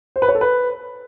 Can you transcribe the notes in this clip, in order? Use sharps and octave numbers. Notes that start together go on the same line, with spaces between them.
C5
B4
C#5
A4
B4